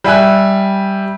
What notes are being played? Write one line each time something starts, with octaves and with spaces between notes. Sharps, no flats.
G3 E5 G#5 F#6